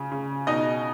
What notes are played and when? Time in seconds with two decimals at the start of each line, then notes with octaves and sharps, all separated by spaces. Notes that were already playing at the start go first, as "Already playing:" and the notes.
Already playing: C#3
0.12 C#3
0.47 B2 D#4 D#5